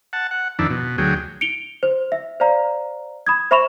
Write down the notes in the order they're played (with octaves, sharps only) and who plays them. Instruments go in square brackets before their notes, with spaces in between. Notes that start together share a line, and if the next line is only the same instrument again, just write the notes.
[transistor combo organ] F#5 A5
F#5
F2 D#3 D4 E4
B2
D2 F#3 G#4 G5
[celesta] C#7 D7 F7 G7
C5
E5
C5 D5 F5 A#5
B5 D#6 G#6
C5 E5 B5 C#6 E7 F7